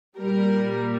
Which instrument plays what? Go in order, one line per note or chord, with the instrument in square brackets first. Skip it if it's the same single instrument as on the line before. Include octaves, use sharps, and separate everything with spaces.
[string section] A#2 G3 A#4